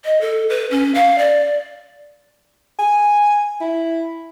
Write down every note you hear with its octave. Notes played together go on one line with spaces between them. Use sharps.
D#5
A4
B4
C#4
F5
D5
G#5
E4